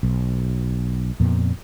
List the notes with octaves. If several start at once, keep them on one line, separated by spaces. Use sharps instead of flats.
B1
F2 A#2 B3